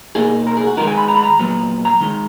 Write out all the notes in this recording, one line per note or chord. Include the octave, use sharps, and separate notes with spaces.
B2 A#3 D#4 G#4
A#4
G#4
F#4
D#3 G#3 B3 D#4 A#4
G#5
B5
A#5
B5
A#5
A#2 F#3 B3
A#5
D#3 G#3 D#4